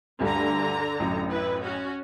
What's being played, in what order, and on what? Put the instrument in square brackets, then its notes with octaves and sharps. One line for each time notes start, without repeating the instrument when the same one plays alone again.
[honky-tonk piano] D2 G2 [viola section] D3 A#5
[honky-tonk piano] A1 F#2
[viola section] E4 B4
C#4 F#4